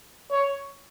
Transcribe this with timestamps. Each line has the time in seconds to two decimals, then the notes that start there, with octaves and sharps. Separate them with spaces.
0.31 C#5